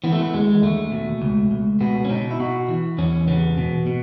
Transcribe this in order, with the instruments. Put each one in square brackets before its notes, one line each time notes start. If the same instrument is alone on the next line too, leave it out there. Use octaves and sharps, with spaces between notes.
[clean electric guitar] E3 B3
A3
B3
D#2 G#3
D#2 A3
B2
C#2
C#2
B2 B3
C#4
B2 D#4
E4
B2 F#4
E3
E2 C#4
C#3 B3
B2
B2